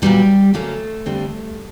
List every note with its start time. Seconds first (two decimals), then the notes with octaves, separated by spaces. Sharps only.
0.02 A#2 F#3 G3 B3 G4
0.54 D3 F#3 A3 A#3 C#4 A4
1.06 G2 D3 G3 C4